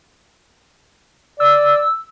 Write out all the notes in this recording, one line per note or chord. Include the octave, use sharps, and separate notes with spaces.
D5 E6